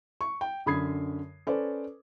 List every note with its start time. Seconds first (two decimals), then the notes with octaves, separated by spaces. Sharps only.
0.21 C#6
0.41 G5
0.66 F#2 D3 B5 D#6 G#6 C7
1.47 C#4 A4 B4 C5 D5